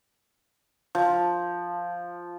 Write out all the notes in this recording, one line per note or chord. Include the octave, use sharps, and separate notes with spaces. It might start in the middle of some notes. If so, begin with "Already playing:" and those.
F3